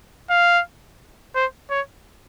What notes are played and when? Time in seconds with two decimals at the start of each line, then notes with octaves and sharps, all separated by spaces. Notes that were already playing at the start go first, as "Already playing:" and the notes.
0.30 F5
1.35 C5
1.70 C#5